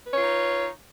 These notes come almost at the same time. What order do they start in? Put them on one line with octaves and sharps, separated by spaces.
B4 C#5 F4 D#4